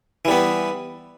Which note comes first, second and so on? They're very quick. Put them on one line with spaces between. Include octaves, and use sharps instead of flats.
E3 G3 B3